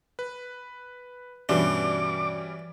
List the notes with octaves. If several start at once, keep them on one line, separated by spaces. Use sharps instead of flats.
B4
G2 B2 E3 G3 C#4 D5 D6